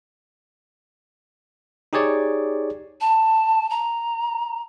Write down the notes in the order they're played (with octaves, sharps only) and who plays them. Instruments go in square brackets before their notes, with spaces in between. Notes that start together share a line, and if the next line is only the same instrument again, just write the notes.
[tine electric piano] D#4 G4 G#4 C#5 D5
[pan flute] A5
A#5